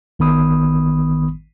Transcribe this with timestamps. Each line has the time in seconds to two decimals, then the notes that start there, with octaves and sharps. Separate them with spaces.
0.19 G#1 D#3 B3 B5 D#6